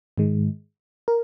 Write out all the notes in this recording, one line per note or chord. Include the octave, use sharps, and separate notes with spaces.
G#2 D#3 G#3
A#4